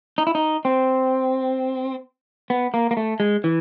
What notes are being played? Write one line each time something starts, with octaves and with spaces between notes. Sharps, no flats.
D#4
E4
D#4
C4
B3
A#3
A#3
A3
G#3
E3